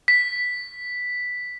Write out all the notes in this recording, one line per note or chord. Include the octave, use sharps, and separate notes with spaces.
B6